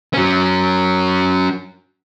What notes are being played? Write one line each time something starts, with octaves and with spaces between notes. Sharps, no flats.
F#3 C#4